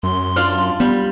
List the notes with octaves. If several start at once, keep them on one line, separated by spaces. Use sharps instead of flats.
F#2 C6
D4 F4 F5
G3 B3